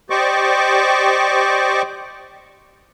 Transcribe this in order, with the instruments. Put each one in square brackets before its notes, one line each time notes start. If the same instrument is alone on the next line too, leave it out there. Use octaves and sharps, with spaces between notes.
[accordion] G4 C5 D5 D#5 C#6 D6